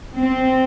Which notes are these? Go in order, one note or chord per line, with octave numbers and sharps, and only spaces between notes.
C4